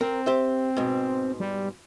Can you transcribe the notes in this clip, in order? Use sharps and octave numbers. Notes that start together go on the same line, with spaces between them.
C4 A#4
G4 C5 E5
G#2 B2
G3